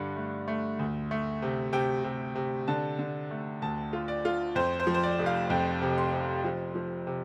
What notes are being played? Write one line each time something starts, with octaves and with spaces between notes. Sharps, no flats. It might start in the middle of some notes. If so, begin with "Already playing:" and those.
Already playing: G2 D3
A3
A3
D2
A3
C3
C3 G5
C3
C3
D3 A5
D3
A3
D2 A5
F4
D5
F4
F2 C5
C5
F3
C5
D5
F1
F5
F2 G5
C3
C6
C3
F3
F3
C3